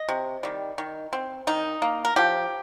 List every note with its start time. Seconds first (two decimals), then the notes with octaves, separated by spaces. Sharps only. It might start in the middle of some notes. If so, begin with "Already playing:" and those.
Already playing: D#5
0.09 C3
0.43 D#3 G3
0.78 D#3
1.13 C4
1.47 D#3 D#4
1.82 A#3
2.05 A#4
2.16 F3 G4